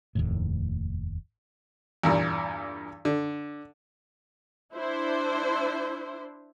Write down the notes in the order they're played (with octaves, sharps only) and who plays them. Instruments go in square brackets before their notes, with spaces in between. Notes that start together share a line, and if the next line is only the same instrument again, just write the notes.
[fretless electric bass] F1 D#2 A2
[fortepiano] E2 G2 A#2
D3
[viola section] D4 E4 C5